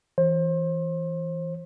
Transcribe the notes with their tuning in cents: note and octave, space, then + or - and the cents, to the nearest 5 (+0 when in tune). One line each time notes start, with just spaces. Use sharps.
E3 +0 C5 +30